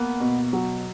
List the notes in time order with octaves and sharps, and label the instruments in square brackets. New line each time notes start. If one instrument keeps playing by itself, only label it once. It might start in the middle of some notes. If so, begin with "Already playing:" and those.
Already playing: [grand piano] A#3 B3
B2
F#3